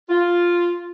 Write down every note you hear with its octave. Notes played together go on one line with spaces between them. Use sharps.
F4